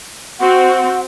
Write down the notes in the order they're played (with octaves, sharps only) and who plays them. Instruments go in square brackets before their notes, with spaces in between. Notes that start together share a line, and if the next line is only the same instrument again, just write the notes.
[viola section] C4 F#4 [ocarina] F#5